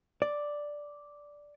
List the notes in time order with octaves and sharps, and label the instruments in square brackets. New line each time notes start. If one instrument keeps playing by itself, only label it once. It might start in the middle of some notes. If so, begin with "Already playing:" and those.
[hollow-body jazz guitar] D5